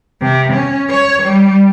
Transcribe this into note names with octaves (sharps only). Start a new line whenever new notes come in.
C3
C#4
C#5
G3